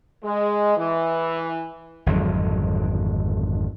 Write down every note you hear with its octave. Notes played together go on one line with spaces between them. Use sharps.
G#3
E3
G#1 F2 D3 F#3